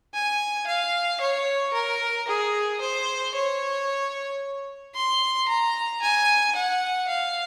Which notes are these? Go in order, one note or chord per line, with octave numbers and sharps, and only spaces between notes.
G#5
F5
C#5
A#4
G#4
C5
C#5
C6
A#5
G#5
F#5
F5